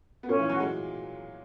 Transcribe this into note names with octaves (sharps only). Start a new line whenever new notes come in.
B3
A#2 A#3 C#4
E3
F#3 F#4
G#3